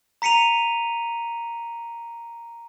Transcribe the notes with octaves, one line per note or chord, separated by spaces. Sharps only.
A#5 B6 C#7 D#7 F7